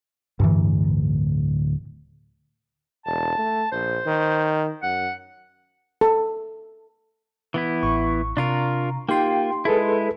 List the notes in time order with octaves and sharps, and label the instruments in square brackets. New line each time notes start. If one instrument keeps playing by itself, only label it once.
[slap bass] D1 [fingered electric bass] G2 E3
[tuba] E1 [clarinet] A5
[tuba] A3
[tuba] A#1 [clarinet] C5
[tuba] D#3
[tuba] F#2 [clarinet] F#5
[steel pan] A4
[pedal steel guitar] E3 B3 E4
[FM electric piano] A1 [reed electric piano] C#6
[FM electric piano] C3 A#5 [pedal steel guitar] D4 F4 A#4
[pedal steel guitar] A#3 F4 [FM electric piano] D#4 G4 C6 [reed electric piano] G5
[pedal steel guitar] G#3 E4 [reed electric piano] G#4 A4 B4